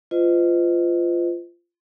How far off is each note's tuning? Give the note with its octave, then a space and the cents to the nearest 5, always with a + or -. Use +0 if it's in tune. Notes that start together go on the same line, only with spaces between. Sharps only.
F4 -15 C5 -45 D#5 +0